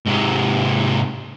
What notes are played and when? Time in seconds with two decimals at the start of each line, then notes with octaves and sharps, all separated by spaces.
0.06 G#2 C3